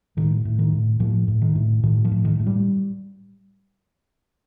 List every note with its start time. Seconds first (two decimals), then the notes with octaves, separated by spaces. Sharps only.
0.17 A2 D#3
0.45 A2
0.59 D#3
0.73 A2
1.00 A2 F3
1.28 A2
1.42 D#3
1.55 A2
1.83 A2 D#3
2.05 F3
2.11 A2
2.25 D#3
2.40 A2
2.47 G3